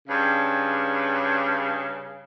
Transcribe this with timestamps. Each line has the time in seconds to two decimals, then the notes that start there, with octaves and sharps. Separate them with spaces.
0.08 G2 C#3